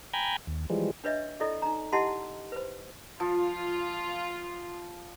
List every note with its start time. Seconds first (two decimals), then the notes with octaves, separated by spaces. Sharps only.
0.13 G5 G#5 A#5 B5 G6 G#6
0.47 D#2
0.70 E3 F3 G3 G#3
1.04 D4 B4 C#5 D#5 E5
1.40 E4 F4 A4 D5 D#5
1.62 D#4 A#5
1.93 E4 G4 D#5 F#5 A5 C6
2.52 B4 C5
3.20 F3 F4